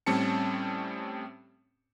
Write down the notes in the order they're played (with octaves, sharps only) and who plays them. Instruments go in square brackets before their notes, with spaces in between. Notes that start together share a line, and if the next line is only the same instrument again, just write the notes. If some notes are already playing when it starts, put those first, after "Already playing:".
[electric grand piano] A2 G3 C4 C#4 A5 C#7